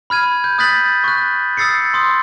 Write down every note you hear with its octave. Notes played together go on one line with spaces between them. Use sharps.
B5 F6 G#6 D#7
G6
D#6 F#6 G6 A6 B6 F#7
C#6 F#6
D#6 E6 A6 C7 C#7
C6 D#6